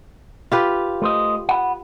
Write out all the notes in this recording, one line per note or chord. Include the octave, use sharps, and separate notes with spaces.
F4 G4 B4
A3 C5 D#5
F#5 B5